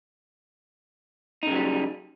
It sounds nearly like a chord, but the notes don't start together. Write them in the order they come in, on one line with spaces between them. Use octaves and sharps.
D#4 C#3 F#3 G3